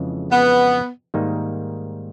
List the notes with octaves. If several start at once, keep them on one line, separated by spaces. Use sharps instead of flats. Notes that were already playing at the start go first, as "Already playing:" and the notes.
Already playing: F2 C#3 E3 G#3
B3
G#2 D#3 G3 A#3 D#4